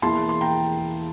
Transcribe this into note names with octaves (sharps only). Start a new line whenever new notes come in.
E1 E2 E3 A#3 E4 A5 C6
C6
G5 A#5